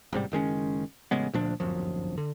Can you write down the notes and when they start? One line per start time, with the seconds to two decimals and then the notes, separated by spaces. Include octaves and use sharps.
0.12 A1 G#2 C3 G3
0.32 F#1 D#3 G#3 C#4
1.11 A1 C#3 G#3 B3
1.34 D2 A#2 F3 D4
1.60 D1 G1 F#2 F3
2.18 D3